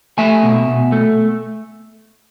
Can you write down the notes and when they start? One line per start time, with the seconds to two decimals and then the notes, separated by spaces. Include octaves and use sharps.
0.18 A3 E5 G#5
0.43 B2
0.68 B2
0.92 A3